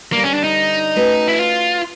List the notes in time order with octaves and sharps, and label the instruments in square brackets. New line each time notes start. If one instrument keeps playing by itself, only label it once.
[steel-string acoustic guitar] G2 D3 G3 [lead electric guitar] A#3
[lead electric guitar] C#4
D4
D#4
[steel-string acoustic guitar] A3 C#4 F#4 B4 D#5
[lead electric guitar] E4
F4